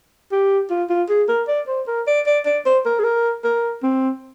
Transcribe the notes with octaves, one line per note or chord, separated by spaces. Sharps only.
G4
F4
F4
G#4
A#4
D5
C5
A#4
D5
D5
D5
C5
A#4
G#4
A#4
A#4
C4